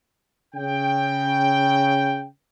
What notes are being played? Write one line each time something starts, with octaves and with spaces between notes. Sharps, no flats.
C#3 G5